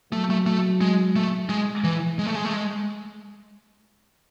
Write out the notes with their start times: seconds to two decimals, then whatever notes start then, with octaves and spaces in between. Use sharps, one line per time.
0.12 F#3 A3
0.30 A3
0.46 A3
0.81 G#3
1.16 A3
1.49 G#3
1.84 E3
2.19 G#3
2.27 A3
2.35 G#3
2.45 A3
2.53 G#3